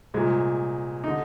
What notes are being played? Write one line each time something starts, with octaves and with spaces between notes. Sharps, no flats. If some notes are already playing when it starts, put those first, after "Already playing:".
C2 A#2 G#3
D#4
D3